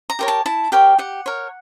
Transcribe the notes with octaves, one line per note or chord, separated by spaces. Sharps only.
A#5
G4 A#4 C#5
A5
E4 A5
G4 A#4 C#5 G5
G4 F#5
A#4 C#5